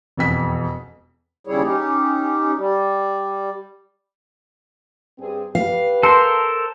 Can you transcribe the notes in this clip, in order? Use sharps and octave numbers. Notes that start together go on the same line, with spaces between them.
E1 F2 B6
D#2 C#3 G3 E4 G#4 C#5
C#4 D#4 G4
G3
G2 C4 G#4
G4 B4 F5
A4 A#4 C5 C6